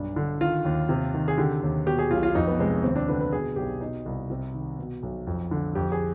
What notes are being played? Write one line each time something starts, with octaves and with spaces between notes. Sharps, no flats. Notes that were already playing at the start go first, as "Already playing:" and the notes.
Already playing: B1 G2 D4
D3
D#3 F4
D#2
C3
D#3
G#4
D3 G4
D#2
B2 G4
G#4
B1 F4
F4
F2 D#4
B3
C3 G#3
D#2 C4
D4
D3 B4
B4
B2 G#4
B1 G4
B2 D#4
C2
C3
D#3
B2
B1
F2
D3
F2 G4
G#4